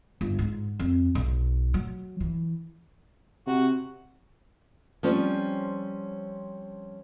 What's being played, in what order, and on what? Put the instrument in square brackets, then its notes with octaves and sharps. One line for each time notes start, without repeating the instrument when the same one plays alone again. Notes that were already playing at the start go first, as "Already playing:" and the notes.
[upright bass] G1
G#2
F2
B1
F#3
E3
[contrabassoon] C3 [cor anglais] F#4
[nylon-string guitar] F3 G3 C4 C#4